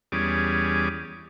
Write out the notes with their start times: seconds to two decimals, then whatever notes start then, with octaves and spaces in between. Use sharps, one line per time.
0.12 E2 G3 C#4 G#4 D6